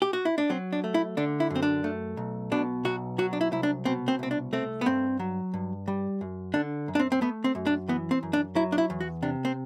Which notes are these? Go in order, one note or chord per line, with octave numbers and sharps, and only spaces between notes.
G4
F#4
E4
D4
F#3 C4
D4
A3
E4
D3 D4
E4
F#2
C4
D4
A3
B1
B2 D4
B1 F#4
F#3 F#4
D4
E4
C2 E4
D4
B2 C4
C4
C2 C4
D4
A3 C4
B3
G2 C4
F#3
G2
G3
F#2
D3 D4
F#2
D4
C4
C4
A3 B3
C4
F#2
D4
E3 B3
C4
F#2
D4
F#3 E4
D4
E4
E2
F#4
C3 D4
C4